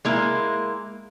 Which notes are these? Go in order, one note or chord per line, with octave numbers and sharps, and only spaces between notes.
G#3 A#3 E4